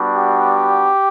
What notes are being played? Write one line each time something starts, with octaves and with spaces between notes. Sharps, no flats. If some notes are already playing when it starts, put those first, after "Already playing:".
Already playing: G3 B3 D4 F#4
G4